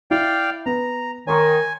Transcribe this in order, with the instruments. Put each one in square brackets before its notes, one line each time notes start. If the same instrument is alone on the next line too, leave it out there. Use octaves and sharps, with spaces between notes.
[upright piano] E4 [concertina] D5 F5 G5
[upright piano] B3 [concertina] A#5
[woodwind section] D#3 [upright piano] C#5 C6 C#6 [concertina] G#5